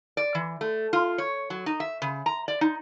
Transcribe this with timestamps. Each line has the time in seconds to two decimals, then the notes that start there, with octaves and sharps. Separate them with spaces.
0.17 D5
0.35 E3
0.61 A3
0.93 F4
1.18 C#5
1.50 F#3
1.66 D#4
1.80 E5
2.02 C#3
2.26 A#5
2.48 D5
2.61 D#4